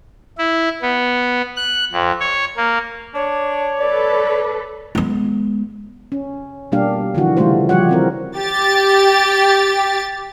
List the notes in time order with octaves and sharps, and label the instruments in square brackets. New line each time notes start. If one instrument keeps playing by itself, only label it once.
[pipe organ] E4
B3
F#6
F2
C#5
A#3
[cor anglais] D4 [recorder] C#5
[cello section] A4 B4 [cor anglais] D5
[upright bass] G#3 B3
[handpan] C#4
B2 G3 A#3 D4 G4 F5
D3 E3 F3 F#4
C#3 E3 G3 A3 F4 C5
F3 G3 F#4 G4 C#5 F#5
E3 C4 A#4
[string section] G4 A6